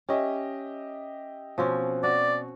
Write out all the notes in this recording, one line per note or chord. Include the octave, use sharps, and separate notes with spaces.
C#4 G4 D#5 E5
B2 F3 C4 C#4
F#4 D5